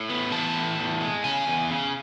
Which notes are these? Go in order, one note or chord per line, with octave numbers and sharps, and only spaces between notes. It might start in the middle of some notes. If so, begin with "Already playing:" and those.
Already playing: A2
B3
E3 A5
A2
E2
G#3
C#3 G#5
E2
C#3